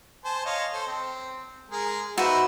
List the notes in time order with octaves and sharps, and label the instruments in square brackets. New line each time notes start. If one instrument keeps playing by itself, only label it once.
[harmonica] C5 G#5 A5
C#5 D#5 F5
A4 C5
C4
G#3 G#4 A#4
[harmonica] D#4 C5 E5 [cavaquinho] F#4 B4